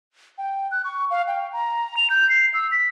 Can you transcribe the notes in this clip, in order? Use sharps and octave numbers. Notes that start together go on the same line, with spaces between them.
G5
F#6
C#6
F5
G5
A#5
F7
G6
C7
E6
B6